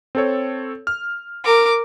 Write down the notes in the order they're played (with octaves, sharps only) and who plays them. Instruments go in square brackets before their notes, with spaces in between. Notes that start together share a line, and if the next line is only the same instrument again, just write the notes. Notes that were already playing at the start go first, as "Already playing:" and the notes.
[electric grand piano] C4 A4 C#5
F6
[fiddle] A#4 D6